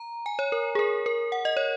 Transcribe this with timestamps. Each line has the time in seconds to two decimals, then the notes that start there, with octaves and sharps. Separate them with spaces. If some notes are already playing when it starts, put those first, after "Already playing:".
Already playing: A#5
0.26 G#5
0.39 C#5
0.52 A#4
0.75 G#4
0.79 A#4
1.06 A#4
1.32 F#5
1.45 D#5
1.57 C#5